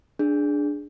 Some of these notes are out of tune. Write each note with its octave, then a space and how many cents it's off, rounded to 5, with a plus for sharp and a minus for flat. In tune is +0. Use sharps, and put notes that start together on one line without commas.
D4 +0 G#4 +0